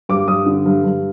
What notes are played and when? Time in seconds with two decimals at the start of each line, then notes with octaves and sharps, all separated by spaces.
0.09 G2 D6
0.28 G2 D#6
0.46 D3
0.66 G2
0.84 G2